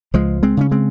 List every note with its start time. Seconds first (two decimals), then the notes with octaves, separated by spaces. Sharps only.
0.14 C#2 F3 G#3
0.43 G#3 C4
0.57 C#3 C#4
0.71 G#3 C4